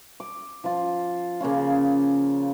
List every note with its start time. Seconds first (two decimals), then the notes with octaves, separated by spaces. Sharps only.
0.20 D6
0.64 F3 F4
1.41 C#3 A#3 C#4 F4